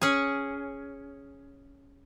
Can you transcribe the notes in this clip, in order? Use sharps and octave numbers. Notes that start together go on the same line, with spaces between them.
C#4 G#4